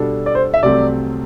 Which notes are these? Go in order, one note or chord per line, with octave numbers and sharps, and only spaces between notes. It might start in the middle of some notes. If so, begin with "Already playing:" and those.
Already playing: B2 G3 D4 A4
D5
C5
E5
C2 C3 F#3 A3 C4 D5